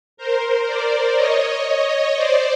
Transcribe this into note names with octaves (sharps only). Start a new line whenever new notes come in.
A#4 C5
C5 D5
C#5 D#5
C5 D5